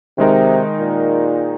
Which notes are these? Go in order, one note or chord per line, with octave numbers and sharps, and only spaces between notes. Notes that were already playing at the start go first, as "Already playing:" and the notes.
C3 D#3 G#3 D#4 A#4
A#2